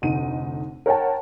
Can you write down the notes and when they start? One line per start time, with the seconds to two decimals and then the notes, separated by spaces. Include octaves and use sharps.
0.02 F1 D2 D#4 D#7
0.86 A#4 C#5 F#5 G5 A5